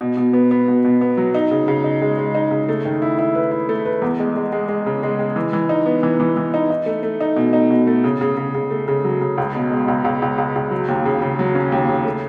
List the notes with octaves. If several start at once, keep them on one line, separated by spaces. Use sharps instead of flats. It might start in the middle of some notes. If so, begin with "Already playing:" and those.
B2
B2
B3
B3
B2
B2
B3
F#3
D#4
C#3
C#3
D#4
G#3
G#3
D#4
C#3
A3
D#3
E4
E4
B4
E4
A3
B4
E2
G#3
G#3
G#3
G#3
C#3
G#3
G#3
E3
E3
D#4
B3
E3
E3
E3
D#4
D#4
A3
A3
D#4
B2
D#4
B2
A3
C#3
C#3
C#3
C#3
A3
C#3
F#3
C#3
C#2
B2
G#3
C#2
C#2
C#2
C#2
C#2
F#3
D#2
C#3
C#3
F#3
C#4
D#2
C#3
A3